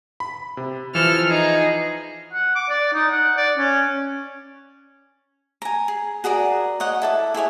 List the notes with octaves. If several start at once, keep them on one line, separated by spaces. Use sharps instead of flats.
B5
C3
E3 F3 A4 F6
D#4 G#4
F#5
D6
D5
D#4
F#5
D5
C#4
G#5 A#5
G#4
F#4 G#4 A#4 D5
C#5 D#5 F#5
E4 A4 D6
E4 G#4 C#5 G#5